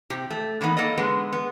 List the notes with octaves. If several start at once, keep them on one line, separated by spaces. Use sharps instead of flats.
C3 G4
A3
D3 E3 A#3 B3 D#4
A#3 A4 C#5 D#5
D3 G#3 B3
B3